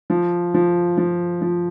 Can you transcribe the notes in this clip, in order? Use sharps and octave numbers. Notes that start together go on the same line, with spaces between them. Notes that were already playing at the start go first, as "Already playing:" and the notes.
F3
F3
F3
F3